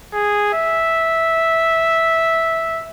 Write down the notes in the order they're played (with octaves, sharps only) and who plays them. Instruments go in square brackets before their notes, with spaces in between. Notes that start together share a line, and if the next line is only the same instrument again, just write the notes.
[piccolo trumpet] G#4
E5